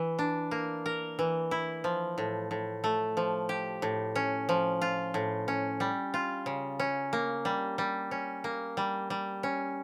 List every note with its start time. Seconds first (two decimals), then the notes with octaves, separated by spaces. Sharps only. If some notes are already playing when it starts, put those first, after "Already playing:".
Already playing: E3
0.19 D4
0.51 A#3
0.86 A#4
1.19 E3
1.51 E4
1.84 F3
2.18 A2
2.51 A2
2.84 A3
3.17 F3
3.49 G4
3.82 A2
4.16 C#4
4.49 F3
4.82 F4
5.14 A2
5.48 C#4
5.80 G3
6.14 F4
6.46 C#3
6.79 C#4
7.13 A#3
7.45 G3
7.78 G3
8.11 C#4
8.44 A#3
8.77 G3
9.10 G3
9.43 C#4